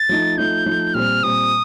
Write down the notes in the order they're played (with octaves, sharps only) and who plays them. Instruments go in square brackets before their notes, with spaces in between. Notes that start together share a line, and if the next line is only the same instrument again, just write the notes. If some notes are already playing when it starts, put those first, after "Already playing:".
Already playing: [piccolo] A6
[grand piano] F3 A3 D#4
[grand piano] F3 A3 D#4 [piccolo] G6
[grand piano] F3 A3 D#4
[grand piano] A#2 G3 C4 [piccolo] F6
[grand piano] A#2 G3 C4 [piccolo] D#6